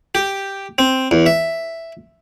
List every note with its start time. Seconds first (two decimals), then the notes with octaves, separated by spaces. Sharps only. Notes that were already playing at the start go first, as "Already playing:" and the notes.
0.15 G4
0.78 C4
1.11 E2
1.26 E5